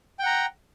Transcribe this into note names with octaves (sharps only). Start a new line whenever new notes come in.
F#5 G5 A#5